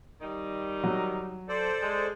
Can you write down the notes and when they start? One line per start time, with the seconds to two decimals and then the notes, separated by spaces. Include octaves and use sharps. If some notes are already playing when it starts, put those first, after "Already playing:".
0.21 D#3 G3 D#4
0.84 F#3
1.49 A4 C5 D5
1.81 G#3